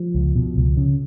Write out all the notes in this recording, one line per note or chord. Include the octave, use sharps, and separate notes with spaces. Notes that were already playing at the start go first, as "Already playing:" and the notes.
Already playing: F3
C#2
B2
C#2
C#3